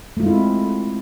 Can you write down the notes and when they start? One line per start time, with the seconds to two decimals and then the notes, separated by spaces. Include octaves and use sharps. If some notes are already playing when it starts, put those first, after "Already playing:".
0.17 A3
0.20 F4
0.23 G#3
0.26 E4
0.29 C4